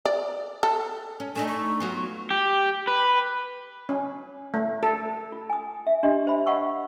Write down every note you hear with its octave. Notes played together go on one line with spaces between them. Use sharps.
D5
A4
C#4
A3 D4 D#4 G#5
C#6
F#3 B3 F4
G4
B4
C#4
A3
A4
F4
G#5 D#6
E5
D4 G4 D#5 C6
C5 E5 B5
D#5 F5 F#5 C#6 E6